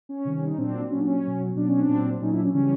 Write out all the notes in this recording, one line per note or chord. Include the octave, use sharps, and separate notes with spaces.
C#4
C3 D#3 G3
D#4
A#2 F#3 C4 D4
A#2 F#3 C#4 D4
C#4
B2 F#3
B2 F#3 D4
C#4
C4 D4
A#2 F#3
A#2 F#3 C#4 D#4
D4 E4
C#4
C#3 E3 G3 C#4